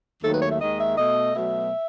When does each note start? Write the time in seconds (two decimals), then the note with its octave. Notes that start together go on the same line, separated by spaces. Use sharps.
0.23 D#2 D#3 F#3 A3 A4
0.32 B4
0.41 C#5
0.51 E5
0.60 D#2 D#3 G#3 D#5
0.79 E5
0.97 B2 A3 D#5
1.35 B2 F#3 A3 E5